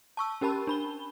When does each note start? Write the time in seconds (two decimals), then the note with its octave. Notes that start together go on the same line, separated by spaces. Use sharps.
0.17 A5 C#6 E6
0.41 C#4 G4 A#4 A5 B5
0.67 D4 B5 G7